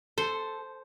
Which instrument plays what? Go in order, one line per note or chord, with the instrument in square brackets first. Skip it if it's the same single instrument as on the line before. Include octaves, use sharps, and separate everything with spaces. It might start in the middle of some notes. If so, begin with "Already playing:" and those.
[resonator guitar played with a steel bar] A4 [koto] C5